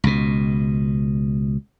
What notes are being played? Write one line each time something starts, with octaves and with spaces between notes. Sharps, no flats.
C#2 B2